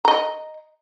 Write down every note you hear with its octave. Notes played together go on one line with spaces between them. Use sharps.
D#5 A#5